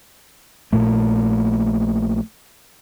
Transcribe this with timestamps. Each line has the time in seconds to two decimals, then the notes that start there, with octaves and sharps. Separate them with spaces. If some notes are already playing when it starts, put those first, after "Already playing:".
0.73 A#1 A#2 A3